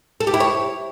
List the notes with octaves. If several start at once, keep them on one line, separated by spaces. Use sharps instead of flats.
A4
G4
E4
C#5